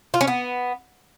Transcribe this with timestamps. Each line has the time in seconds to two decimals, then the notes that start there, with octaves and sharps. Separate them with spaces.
0.14 F4
0.21 C#4
0.28 B3